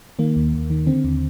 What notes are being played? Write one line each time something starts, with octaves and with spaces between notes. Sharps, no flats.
D#3 A#3
D#2
D#2
D#3
D3 C4
D#2